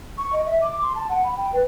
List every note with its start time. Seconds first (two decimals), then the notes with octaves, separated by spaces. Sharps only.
0.18 C#6
0.33 D#5
0.46 E5
0.61 D6
0.82 C6
0.95 A5
1.09 F#5
1.24 B5
1.37 G5
1.53 B4